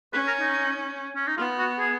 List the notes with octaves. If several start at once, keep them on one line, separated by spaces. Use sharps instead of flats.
C#4 B4
A#4
D#4
C#4
D#4
B3 F4
F#4
G#4